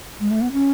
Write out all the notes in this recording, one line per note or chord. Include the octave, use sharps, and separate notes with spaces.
G#3
A3
B3
C#4